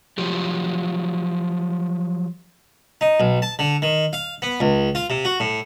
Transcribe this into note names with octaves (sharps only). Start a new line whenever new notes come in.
F3 F#3 G4
D#4
B1
A5
D3
D#3
F5
B3
C#2
F4
C3
F#4
A2